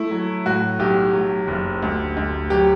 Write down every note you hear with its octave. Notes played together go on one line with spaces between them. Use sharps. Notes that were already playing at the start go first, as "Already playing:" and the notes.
Already playing: A3 E4
F#3
A2 F#4
B1 G4
F#3
F#1
D2
D2
F#3 G4